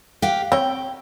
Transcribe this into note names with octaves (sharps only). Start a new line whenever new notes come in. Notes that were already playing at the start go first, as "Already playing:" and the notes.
G4 F5 F#5
C4 C#5 G5